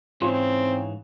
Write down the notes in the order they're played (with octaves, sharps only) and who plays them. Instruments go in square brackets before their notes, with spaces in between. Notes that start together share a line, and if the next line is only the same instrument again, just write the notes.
[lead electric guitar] G#2 E3 [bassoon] C#3 [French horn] C4 [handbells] F4